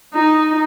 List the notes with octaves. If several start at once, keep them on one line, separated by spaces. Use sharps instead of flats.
D#4